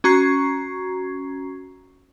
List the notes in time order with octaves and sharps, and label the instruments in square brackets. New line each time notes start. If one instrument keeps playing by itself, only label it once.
[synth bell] C#4 F#4 A#5 C#6 G#6 C7